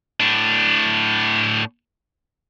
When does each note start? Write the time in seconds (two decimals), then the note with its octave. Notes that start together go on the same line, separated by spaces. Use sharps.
0.20 A2 D4